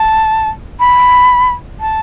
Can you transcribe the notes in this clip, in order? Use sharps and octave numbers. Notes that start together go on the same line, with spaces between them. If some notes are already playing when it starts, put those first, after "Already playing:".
Already playing: A5
B5
A5